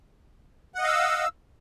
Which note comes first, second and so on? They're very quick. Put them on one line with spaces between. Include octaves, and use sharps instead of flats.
F#5 D#5 F5 E6